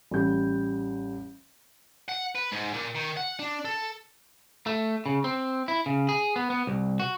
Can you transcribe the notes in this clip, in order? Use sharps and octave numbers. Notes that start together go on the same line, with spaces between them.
A1 G3 G6
F#5
B4
G#2
A#2
D#3
F#5
D4
A4
A3
C#3
C4
E4
C#3
G#4
B3
B3
C2
F#4